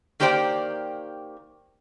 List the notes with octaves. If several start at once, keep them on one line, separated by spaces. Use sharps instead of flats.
D#3 A#3 G4 C5 D5 G5